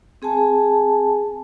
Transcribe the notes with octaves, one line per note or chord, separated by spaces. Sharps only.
C4 G#4 G#5 A5